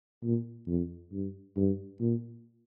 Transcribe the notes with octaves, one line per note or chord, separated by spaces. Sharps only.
A#2
F2
G2
G2
A#2